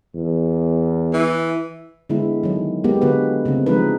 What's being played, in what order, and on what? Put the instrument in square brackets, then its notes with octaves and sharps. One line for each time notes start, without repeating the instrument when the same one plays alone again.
[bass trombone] E2
[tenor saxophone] E3
[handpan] D3 G#3 B3 E4
D#3 F#3
G#3 A#3 B3 G4
D3 B3 F#4 B4
C#3 A3 C4
F3 G#3 D4 D#4 B4